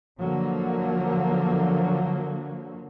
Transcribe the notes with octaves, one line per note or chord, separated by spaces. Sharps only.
D3 F3 F#3 A#3